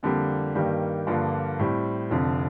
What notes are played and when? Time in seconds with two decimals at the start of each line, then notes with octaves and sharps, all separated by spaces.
0.03 F2 D3 G3 A#3
0.55 G2 D#3 G3 A#3
1.07 G2 D3 F3 A#3 F4
1.59 A2 G3 C4
2.11 F1 F2 D3